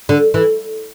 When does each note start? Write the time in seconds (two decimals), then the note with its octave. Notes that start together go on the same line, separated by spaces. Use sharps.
0.09 D3
0.34 E3